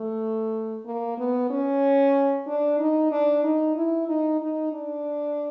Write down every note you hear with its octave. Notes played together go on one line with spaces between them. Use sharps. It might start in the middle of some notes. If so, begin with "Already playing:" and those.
Already playing: A3
A#3
B3
C#4
D4
D#4
D4
D#4
E4
D#4
D#4
D4